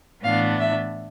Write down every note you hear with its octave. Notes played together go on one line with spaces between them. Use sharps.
A2 E3 B3 D4 F5
E5